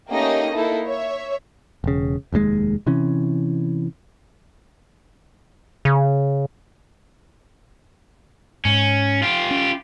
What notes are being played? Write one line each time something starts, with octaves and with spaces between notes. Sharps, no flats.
A3 A#3 C#4 D#4 G4 D#5
A#3 D#4 E4 A4
C#5 E5
E1 C#3
F1 D#2 A#2 G#3
C3 E3 C#4
C#3
G#2 C#4
F4 G4
C#4